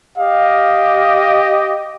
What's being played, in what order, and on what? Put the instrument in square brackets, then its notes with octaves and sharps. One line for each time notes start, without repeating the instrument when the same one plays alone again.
[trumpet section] G4 D#5 [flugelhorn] F5